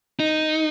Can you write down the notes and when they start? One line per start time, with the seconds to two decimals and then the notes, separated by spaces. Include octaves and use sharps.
0.20 D#4